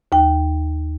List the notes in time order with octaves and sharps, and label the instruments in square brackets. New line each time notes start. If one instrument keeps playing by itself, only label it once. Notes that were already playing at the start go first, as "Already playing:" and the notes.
[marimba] D#2 G5